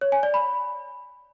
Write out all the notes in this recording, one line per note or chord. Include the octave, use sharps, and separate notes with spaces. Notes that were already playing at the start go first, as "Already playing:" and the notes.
C#5
G#5
D5
B5